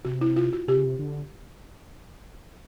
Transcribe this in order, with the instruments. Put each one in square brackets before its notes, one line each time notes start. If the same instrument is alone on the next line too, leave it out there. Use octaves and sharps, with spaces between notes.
[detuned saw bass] C3 [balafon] F#4
[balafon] E4
F4
F#4
[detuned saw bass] C3 [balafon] G4
[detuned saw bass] C#3
C3
D3